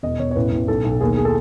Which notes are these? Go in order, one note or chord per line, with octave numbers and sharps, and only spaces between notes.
E1 D#5
E1 C#5
C#5
A1 B4
A1
B1 A4
B1
D#2 G#4
G#4
A4